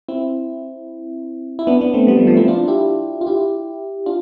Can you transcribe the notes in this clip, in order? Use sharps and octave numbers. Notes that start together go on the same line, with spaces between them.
C4 E4
E4
B3 D4
B3 D4
A3 C4
G3 B3
F3 A3
F3 A3
C4 E4
D4 F4
E4 G4
F4
E4 G4
D4 F4